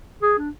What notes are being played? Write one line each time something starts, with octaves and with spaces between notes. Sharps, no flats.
G#4
D4